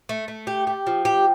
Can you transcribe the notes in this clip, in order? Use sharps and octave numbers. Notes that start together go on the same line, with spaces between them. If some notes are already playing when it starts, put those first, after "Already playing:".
A3
A3
G4
G4
F3
G4